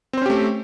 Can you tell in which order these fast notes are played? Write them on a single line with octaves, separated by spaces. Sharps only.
C4 C5 C#4 G4 A3